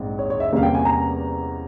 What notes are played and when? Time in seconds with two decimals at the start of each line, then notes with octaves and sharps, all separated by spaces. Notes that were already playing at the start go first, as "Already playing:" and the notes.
Already playing: A#1 G#2 C4
0.19 C#5
0.30 C#5
0.40 E5
0.52 E2 C3 G3 A#3 C#4 F5
0.63 G5
0.75 G#5
0.85 A#5